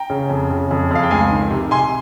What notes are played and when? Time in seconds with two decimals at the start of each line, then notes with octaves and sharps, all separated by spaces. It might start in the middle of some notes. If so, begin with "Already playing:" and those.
Already playing: G5 A#5
0.10 C#3
0.30 F2
0.50 C#3
0.71 F2
0.91 F2 F5
1.03 G5
1.11 C#2 F5 G#5
1.31 D#3
1.51 C3
1.71 C3 G#5 C6